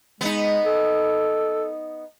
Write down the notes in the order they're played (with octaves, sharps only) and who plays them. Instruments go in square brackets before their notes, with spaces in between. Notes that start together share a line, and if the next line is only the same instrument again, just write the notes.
[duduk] G#3 [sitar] B3 D#4
[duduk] A4